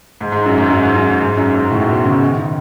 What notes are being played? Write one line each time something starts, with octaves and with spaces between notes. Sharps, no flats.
G#2
G#2
F#2
G#2
F#2
G#2
F#2
G#2
G#2
F#2
G#2
A2
B2
C#3
D#3
D#3